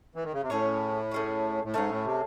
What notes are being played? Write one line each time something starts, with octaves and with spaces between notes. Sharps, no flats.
E3
D#3
C#3
C3
A2 A3 C#4 G#4 C#5
A3 C#4 G#4 C#5
A2
G#2 A3 C#4 G#4 C#5
A2
C3